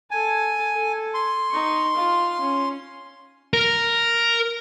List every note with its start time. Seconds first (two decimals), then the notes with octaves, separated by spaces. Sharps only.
0.11 A4 G#5 A5
0.74 A4
1.14 C6
1.51 D#4 C#6
1.96 F4 F5
2.41 C#4
3.54 A#4